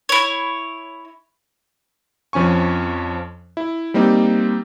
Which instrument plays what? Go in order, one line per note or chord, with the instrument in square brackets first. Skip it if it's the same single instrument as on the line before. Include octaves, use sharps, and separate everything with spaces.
[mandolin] E4 C#5
[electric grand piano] F2 F3 C#4 G#5 C#6
E4
G3 A#3 C4 D#4